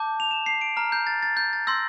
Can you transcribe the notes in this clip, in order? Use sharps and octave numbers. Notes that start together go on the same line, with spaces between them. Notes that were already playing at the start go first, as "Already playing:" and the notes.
Already playing: A5 D6 G6
F7
E7
C7
D7
A#5 F6
G6
A6
A6
G6
A6
C6 E6 G6 A#6